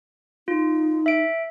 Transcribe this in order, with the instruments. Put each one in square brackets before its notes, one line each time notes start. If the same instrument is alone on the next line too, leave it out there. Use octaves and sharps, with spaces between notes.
[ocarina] D#4 [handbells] F4
[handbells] E5 D7